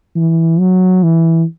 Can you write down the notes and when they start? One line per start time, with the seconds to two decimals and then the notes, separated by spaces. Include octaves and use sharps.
0.16 E3
0.60 F#3
1.03 E3